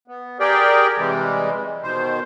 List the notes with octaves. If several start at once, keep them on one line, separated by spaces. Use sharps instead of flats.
B3
G4 G#4 A#4 D5 G5
C3 E3 G3 G#3
B2 D#3 C5